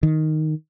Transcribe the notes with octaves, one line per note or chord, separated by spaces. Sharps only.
D#3